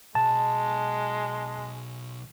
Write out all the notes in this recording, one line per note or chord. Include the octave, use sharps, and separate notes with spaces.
B1 G#3 A5